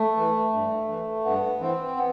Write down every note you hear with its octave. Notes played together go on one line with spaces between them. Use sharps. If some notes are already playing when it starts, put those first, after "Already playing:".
Already playing: A3
E3
G2
E3
G2 B3
E3 C4
B3